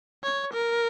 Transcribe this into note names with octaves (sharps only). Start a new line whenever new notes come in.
C#5
A#4